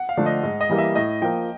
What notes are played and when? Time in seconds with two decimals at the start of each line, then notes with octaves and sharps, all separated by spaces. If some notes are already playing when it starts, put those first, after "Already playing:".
Already playing: F#5
0.09 F5
0.17 D3 F3 A3 D4
0.26 D#5
0.43 G#2
0.61 D#5
0.69 E3 G3 A#3
0.78 E5
0.95 A2 D#5
1.22 F3 A#3 G5